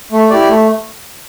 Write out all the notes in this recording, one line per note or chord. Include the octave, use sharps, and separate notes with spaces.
A3
E4 G4 D5
A3